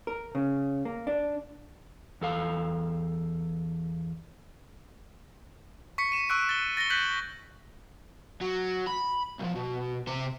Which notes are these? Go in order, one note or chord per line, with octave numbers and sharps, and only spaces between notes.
A#4
C#3
A#3
D4
E2 A4 F5
C#6 B6 C#7
D#7 E7
C#6 E6 F#6 D7
A6 G7
A6 A#6 C#7 G7
F#6 G6 B6 F#7
F#3
B5
B1 F3
B2
C3 C5